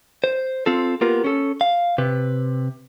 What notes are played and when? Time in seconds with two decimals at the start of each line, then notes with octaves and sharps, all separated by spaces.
0.24 C5
0.66 C4 F4 A4
1.01 A#3 B3 F4 G4 A#4
1.24 C#4 A4
1.61 F5
1.98 C3 B4